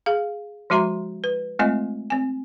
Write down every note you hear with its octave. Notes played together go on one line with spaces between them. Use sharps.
G#4 F5
F3 G#3 F#4 E5 A#5 C6
B4
G#3 A3 C4 F4 D#5 G#5
C4 G#5